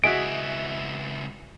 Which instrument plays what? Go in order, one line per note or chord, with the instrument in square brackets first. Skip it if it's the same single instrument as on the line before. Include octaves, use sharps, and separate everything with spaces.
[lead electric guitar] C#2 E4 [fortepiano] F#4 G#4 [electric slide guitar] D#5 E5 [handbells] D7